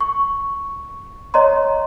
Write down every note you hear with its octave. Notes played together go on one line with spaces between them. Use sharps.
C#6
C#5 D#5 A#5 C6